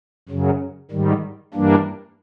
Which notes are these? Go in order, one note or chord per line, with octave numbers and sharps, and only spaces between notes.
F#2 C#3 F#3
G#2 D#3 G3
G2 E3 G3 A#3 D4